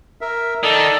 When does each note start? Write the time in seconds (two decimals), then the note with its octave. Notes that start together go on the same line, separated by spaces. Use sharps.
0.21 A#4 E5
0.63 D#3 A4 D5 D#6